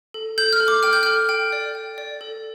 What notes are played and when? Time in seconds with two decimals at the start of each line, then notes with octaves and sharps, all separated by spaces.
0.14 A4
0.38 A4 G6
0.53 F6
0.60 A4
0.68 D6
0.83 G5 F6
0.93 G6
1.03 A4 F6
1.29 G5
1.52 D5
1.75 G5
1.98 D5
2.21 A4